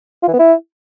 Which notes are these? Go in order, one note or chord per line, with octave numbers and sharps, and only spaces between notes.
F4
E3
B3
E4